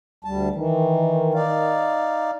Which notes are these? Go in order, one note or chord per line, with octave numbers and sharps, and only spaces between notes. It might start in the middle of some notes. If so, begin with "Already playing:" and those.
D2 G3 A5
D#3 E3
D#4 D5 F5